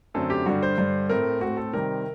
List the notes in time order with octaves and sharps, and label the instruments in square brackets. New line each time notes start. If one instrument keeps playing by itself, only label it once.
[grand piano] F#2 D3 A3 C4 A4
G4
G2 D3 G3 F#4
C5
G2 D3 G3
A2 A3 C4 A#4
A2 A3 C4 F#4
A4
C3 D#3 G3 C4 A#4